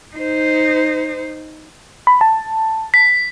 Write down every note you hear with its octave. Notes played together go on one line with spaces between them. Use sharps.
D#4 C5
B5
A5
B6